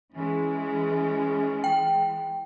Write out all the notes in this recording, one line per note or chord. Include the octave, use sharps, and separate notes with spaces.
E3 G#3 C#4
G5